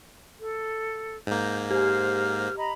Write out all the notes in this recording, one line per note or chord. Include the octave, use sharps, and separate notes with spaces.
A4
G#2 A#3 G6
G4 C5 F6
D#5 A#5 B5